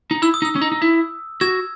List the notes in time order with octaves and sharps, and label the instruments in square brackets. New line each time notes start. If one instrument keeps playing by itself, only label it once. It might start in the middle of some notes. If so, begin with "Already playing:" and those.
[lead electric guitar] D#4
[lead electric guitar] E4 [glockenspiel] E6
[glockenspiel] D#6
[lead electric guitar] D#4
[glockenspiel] E6
[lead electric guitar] C#4
D#4
D#4
E4
[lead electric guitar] F#4 [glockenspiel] E6 G#6